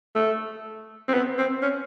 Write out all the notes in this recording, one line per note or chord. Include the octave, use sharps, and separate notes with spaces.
A3
C4
B3
C4
C#4